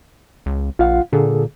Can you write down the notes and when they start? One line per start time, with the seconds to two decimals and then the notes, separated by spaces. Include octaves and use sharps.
0.46 C#2
0.79 A#1 F4 F5 F#5
1.13 A#2 D3 G#4 A4